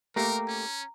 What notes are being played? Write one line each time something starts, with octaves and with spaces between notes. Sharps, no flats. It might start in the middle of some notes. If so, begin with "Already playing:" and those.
A3 A#3 G4 A#4 A#5
C#4